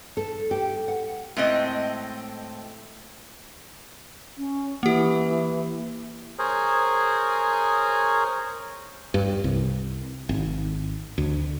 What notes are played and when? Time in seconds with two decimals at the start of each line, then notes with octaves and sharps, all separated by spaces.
0.17 A4
0.51 G4
0.88 F#5
1.37 A2 G#3 C4 D#5
4.38 C#4
4.83 E3 A#3 G4
6.39 G#4 A#4 C5 C#5
9.14 G2
9.44 C2
10.29 G#1
11.18 D2